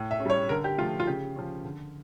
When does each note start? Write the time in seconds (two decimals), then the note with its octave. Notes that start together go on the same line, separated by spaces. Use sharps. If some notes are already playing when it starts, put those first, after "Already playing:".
Already playing: A2
0.11 E5
0.20 C#4
0.25 G3 C#5
0.49 D3 A#4
0.64 G4
0.78 F3 A3 F4
1.00 F4
1.07 C#3 G4
1.36 F3 C#4
1.64 D3